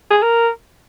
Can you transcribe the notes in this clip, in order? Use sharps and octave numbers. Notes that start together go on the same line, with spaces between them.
G#4
A#4